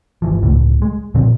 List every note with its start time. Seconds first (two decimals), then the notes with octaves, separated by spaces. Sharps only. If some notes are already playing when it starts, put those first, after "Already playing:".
0.22 G1 E3 F3
0.43 C#2 A2
0.82 G#3
1.15 A#2 D3 F3 C4